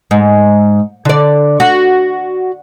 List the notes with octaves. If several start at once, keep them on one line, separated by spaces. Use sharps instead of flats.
G#2
D3 D5
F#4